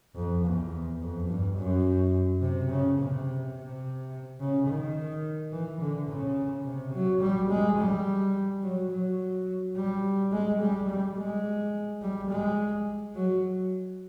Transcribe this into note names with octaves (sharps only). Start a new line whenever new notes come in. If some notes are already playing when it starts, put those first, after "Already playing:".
F2
E2
F2
G2
F#2
C3
C#3
C3
C3
C#3
D#3
E3
D3
C#3
C3
F#3
G3
G#3
G3
F#3
F#3
G3
G#3
G3
G3
G#3
G3
G#3
F#3